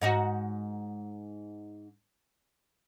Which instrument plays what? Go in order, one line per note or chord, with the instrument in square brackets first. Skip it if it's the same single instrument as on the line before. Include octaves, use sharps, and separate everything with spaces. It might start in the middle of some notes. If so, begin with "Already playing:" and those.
[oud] G#2 D#4 F#4